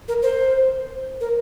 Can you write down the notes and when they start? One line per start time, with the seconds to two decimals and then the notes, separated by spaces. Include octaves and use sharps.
0.08 A#4
0.22 C5
1.20 A#4